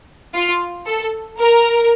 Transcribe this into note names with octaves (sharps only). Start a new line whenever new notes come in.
F4
A4
A#4